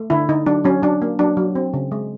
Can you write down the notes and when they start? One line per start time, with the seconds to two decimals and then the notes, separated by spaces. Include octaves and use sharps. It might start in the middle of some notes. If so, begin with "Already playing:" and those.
Already playing: A3
0.10 D3 E4
0.29 D3 D#4
0.46 F#3 D4
0.64 F#3 C#4
0.82 F#3 D4
1.02 A#3
1.19 F#3 D4
1.37 F#3
1.55 C4
1.74 C#3
1.92 G#3